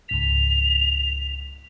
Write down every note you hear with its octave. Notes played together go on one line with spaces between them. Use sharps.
C#2 G#2 B6 F7